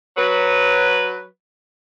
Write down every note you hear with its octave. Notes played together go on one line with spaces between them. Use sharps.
F#3 B4